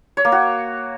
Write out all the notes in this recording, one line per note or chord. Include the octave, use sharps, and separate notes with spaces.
C#5
A#3
F#4